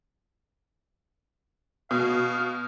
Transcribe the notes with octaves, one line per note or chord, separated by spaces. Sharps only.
B2 F5